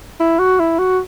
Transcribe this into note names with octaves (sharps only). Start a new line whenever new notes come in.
E4
F#4
E4
F#4